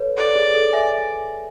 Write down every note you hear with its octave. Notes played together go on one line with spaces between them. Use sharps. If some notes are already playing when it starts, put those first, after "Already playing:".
Already playing: A4 B4 C#5
A4 D5
G#4
A4
E5 G#5